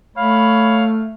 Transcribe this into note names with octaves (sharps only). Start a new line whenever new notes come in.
A3 C#5 F5 B5